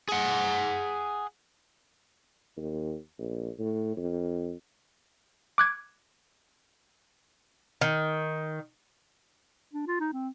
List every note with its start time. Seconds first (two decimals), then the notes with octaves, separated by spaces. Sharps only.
0.09 G#4 F#5
2.57 D#2
3.19 A#1
3.59 A2
3.97 F2
5.58 D6 F#6 G#6
7.81 D#3
9.73 D4
9.87 F4
10.00 D#4
10.13 C4